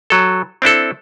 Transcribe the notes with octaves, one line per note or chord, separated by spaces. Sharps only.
F#3 A4
C4 D4 E4 A4